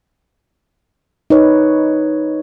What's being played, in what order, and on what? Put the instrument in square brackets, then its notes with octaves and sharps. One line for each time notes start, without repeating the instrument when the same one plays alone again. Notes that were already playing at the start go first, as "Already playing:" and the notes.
[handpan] D#4 B4 C#5